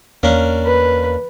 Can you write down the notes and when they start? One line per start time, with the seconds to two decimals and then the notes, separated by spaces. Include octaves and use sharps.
0.23 E2 A#3 C#4 D4
0.66 B4